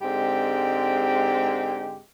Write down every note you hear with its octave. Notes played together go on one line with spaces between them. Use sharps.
G#2 D3 G#3 C4 G4